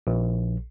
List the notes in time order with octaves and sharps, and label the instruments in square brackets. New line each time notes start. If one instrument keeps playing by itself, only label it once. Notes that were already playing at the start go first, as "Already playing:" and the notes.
[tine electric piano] A#1